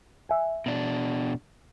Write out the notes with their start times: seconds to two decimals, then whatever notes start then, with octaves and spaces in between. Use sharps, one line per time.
0.29 E5 G#5
0.66 B2 D4